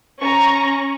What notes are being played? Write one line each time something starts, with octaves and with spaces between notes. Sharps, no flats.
C#4 A#5 C#6